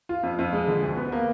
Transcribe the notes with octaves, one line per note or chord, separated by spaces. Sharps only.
F4
F2
F2
G#3
D3
D2
B3
A#3